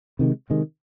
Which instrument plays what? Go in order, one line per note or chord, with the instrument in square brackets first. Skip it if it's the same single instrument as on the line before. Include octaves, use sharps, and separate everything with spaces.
[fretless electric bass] C3 D#3 G#3
C3 D#3 G#3